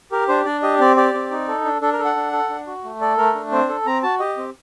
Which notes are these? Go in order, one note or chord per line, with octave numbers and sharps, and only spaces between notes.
G4 A#4
D4 C5
D4 D5
G4 D#5
C4 D5
G4 D5
C4
D#4
A4
D4
D4 A4
A#4
A4
F#5
D4
A4
D4
F#4
A3
A4 D5
A3 A#4
D4
C4 C5
A4
C4 A#5
F#4 A5
G4 D#5
C4